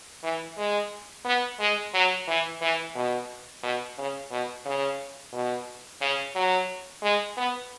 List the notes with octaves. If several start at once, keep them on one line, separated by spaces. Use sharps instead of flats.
E3
G#3
B3
G#3
F#3
E3
E3
B2
B2
C#3
B2
C#3
B2
C#3
F#3
G#3
B3